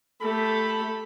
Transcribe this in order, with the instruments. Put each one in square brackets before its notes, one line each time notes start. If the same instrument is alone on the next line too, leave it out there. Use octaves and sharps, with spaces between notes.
[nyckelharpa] A3 G4 [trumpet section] A4 B5